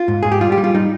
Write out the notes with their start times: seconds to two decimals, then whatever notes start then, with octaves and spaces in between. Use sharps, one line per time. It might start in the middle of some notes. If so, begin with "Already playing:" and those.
Already playing: F4
0.08 G#2
0.23 G#2 G#4
0.32 G4
0.41 G3 F4
0.52 G4
0.58 G3
0.64 F4
0.74 G3 D#4